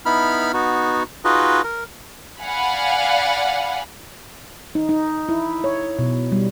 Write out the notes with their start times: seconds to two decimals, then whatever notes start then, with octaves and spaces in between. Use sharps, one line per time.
0.06 B3 D#4 E4 B5 F6
0.54 B3 D#4 F#4
1.25 D#4 F4 F#4 G#4 B4 D#5
1.64 A#4
2.41 D5 F5 F#5 G#5 B5
4.75 D#4
4.89 D#4
5.29 E4
5.64 C#5
5.99 B2
6.32 G3